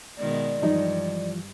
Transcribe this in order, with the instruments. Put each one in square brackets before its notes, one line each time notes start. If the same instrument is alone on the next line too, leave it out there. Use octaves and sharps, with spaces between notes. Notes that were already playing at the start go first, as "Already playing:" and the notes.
[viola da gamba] B2 D#3 G#3 [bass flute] D5
[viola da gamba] G2 [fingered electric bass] E3 F3 G3 [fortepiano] D#4